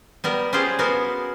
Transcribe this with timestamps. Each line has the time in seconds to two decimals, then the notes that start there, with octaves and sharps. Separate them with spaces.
0.24 G3 B3 A#4
0.53 C#4 F4 G4 G#4 C5
0.79 B3 F#4 A#4 F5